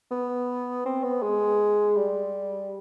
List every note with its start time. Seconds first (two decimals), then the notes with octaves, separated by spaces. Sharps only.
0.11 B3
0.86 C4
1.04 B3
1.22 G#3
1.96 G3